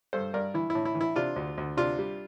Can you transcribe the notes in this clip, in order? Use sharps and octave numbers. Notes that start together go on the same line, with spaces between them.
G2 A4 C5
G2 A#4 D5
E3 E4
E4
A2
E4
E3
E4
C3 D4 F4
D2
D2
C3 D4 F4
G3